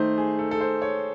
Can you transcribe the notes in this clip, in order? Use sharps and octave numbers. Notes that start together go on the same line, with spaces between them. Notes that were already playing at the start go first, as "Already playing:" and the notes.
Already playing: D#3 A3 D#4 C5
G#4
A4
A4
C5
C#5